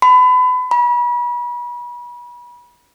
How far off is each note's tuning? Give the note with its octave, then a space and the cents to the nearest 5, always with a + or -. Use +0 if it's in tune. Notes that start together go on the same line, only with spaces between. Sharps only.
B5 +30
B5 -35